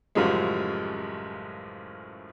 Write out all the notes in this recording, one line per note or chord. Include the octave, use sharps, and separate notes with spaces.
A1 F#2 C#3 F3 G3 G#3